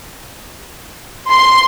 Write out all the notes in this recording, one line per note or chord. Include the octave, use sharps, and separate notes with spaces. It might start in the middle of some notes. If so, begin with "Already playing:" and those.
C6